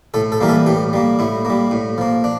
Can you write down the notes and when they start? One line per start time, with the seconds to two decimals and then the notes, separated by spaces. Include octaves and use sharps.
0.14 A2 A4
0.32 A4
0.40 E3 G3 A#3 A#4
0.49 A4
0.66 A2 G4
0.93 G3 A#3
1.19 A2 E4
1.45 G3 A#3
1.71 A2
1.98 F3 A#3
2.24 D4